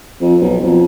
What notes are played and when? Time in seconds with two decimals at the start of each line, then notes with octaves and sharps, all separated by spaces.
0.21 F2
0.42 B1
0.63 F2